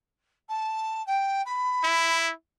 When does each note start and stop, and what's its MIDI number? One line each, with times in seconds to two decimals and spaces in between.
0.49 1.05 81
1.07 1.42 79
1.46 2.17 83
1.84 2.32 64